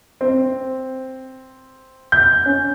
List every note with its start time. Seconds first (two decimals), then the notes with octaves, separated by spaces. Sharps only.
0.21 C4
2.12 G6
2.46 C#4